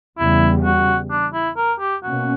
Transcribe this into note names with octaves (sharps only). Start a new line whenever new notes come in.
E2 C#3 G3 E4
F#4
D4
E4
A#4
G4
B2 A#3 C#4 F#4